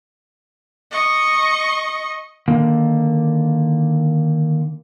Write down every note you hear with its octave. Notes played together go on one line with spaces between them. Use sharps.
D#5 C#6
D3 D#3 A#3